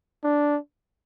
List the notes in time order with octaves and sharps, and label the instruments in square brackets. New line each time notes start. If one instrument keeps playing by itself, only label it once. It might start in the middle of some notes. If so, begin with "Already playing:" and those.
[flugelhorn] D4